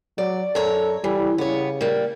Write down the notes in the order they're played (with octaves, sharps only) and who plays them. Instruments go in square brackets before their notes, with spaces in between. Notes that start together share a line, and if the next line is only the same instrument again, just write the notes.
[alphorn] F#3 [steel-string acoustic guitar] D5
[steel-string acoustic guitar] F#2 C#5 A#5 [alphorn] A4
[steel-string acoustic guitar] E3 [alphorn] G3
[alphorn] C#3 [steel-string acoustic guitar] B3 C#5
[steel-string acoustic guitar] G3 A#3